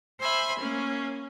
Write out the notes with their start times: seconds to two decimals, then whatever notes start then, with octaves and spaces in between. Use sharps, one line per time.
0.20 C5 E5 G#5 B5
0.59 A#3 C#4